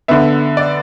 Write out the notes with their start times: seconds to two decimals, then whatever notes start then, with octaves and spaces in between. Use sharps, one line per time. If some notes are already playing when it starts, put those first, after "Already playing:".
0.08 D3 B3 E5
0.57 D5